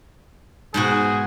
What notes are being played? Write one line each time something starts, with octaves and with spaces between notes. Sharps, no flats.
G#2 B2 F#4 G#4